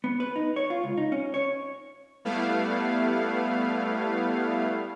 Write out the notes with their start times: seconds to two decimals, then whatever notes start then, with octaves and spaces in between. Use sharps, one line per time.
0.04 B3
0.20 B4
0.36 D#4
0.56 C#5
0.70 F4
0.83 C#2
0.98 D#4
1.12 C#4
1.34 C#5
2.25 G3 A3 B3 E4 F5